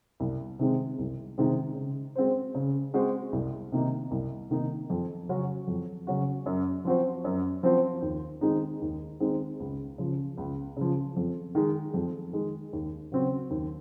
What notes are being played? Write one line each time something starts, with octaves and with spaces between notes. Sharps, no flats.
C2
C3 D#3 G#3 C4
C2
C3 D#3 G#3 C4
C#3
G#3 C4 F#4 C5
C#3
G#3 C4 F#4 C5
C2
C3 D#3 A#3 D#4
C2
C3 D#3 A#3 D#4
F2
C#3 F#3 C#4 F#4
F2
C#3 F#3 C#4 F#4
F#2
F3 C4 F#4 C5
F#2
F3 C4 F#4 C5
D#2
D#3 G#3 C4 D#4
D#2
D#3 G#3 C4 D#4
C#2
C#3 F3
C#2
C#3 F3
F2
D#3 G#3
F2
D#3 G#3
D#2
C#3 F#3 C4 F#4
D#2